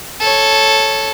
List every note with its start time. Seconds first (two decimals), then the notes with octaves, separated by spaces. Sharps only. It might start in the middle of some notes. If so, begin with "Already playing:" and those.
0.20 A4 C#5